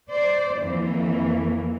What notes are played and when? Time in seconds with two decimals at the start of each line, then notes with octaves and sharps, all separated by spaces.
0.11 C5 D5
0.61 F2 E3 A#3